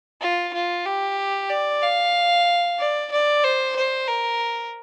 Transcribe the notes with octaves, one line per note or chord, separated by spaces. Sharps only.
F4
F4
G4
D5
F5
D5
D5
C5
C5
A#4